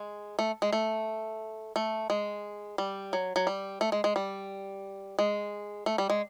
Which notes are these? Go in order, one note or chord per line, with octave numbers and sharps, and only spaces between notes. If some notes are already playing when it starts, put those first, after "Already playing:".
Already playing: G#3
A3
G#3
A3
A3
G#3
G3
F#3
F#3
G3
A3
G#3
G#3
G3
G#3
A3
G3
G#3